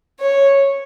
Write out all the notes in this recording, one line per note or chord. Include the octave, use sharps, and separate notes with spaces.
C#5